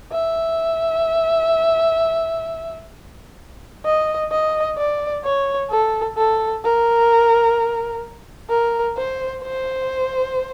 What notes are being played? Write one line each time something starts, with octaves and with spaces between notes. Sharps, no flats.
E5
D#5
D#5
D5
C#5
A4
A4
A#4
A#4
C5
C5